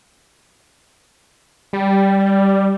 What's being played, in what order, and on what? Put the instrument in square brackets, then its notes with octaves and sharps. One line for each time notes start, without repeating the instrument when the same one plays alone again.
[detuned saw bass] G3